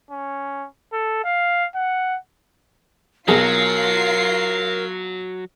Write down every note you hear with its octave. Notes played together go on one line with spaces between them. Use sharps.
C#4
A4
F5
F#5
B1 F#3 F4 G#4 A#4 C7